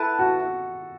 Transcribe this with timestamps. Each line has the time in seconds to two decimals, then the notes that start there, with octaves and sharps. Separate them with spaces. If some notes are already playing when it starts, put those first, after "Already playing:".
Already playing: E4 A4 B4 F#5 A5
0.19 F#4